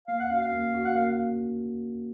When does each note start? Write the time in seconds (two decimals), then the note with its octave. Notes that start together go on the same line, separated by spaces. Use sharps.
0.08 A#3 F5
0.20 F#5
0.30 C#4 F#4 F5
0.42 F5
0.52 A#3
0.74 C#4 F#4
0.85 F#5
0.95 A#3 F5